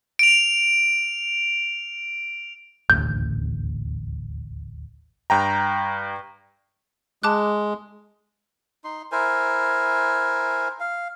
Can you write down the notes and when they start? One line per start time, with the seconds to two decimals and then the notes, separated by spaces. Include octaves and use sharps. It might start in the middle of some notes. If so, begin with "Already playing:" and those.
0.19 D7 F7
2.90 D#1 A1 D2 G6
5.30 G2 G5 A#5
7.23 G#3 A5 D6 F#6
8.84 D#4 C6
9.12 E4 A#4 C5 G#5
10.80 F5